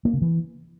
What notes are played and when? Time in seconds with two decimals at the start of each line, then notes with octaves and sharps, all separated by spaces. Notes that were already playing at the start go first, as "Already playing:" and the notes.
0.05 A#3
0.13 C#3
0.22 E3